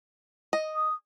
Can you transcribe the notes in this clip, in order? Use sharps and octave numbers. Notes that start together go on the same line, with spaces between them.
D#5
D#6